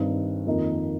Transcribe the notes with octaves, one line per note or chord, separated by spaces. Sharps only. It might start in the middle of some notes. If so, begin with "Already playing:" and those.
Already playing: G2 D#3 C4 D#4
F2 D#3 A#3 D#4